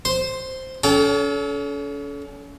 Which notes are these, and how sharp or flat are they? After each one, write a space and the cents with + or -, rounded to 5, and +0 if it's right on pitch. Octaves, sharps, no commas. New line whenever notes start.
C5 +0 C6 +0
C#4 +35 A4 -25 G5 +0